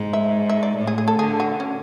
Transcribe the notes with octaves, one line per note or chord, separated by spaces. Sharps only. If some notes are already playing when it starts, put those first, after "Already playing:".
Already playing: G#2
E5
E5
D5
A2
G#4
G#4
A4
D3 G#4
F#4
C#4